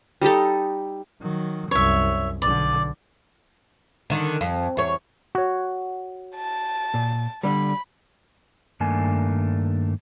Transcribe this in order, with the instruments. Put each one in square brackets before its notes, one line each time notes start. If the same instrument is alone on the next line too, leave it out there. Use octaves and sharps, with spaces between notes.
[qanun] G3 D#4 G4 A4
[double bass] D#3 F#3
[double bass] C2 F#2 [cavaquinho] C#5 E5
[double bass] B1 D3 [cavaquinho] D5
[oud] D3 D#3
F2
E2 C#5
[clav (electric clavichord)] F#4 C#5
[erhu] A5
[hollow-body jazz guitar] A#2
[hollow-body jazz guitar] D3 G3 [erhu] B5
[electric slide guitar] G2 D#3 A3 A#3 D4 G#5